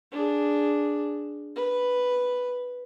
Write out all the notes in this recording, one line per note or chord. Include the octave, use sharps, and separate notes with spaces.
D4 G#4
B4